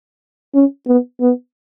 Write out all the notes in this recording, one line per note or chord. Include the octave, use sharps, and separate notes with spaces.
C#4
B3
B3